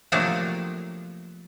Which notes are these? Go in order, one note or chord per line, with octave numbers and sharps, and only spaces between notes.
C3 F3 F#3 A3 A#3 D4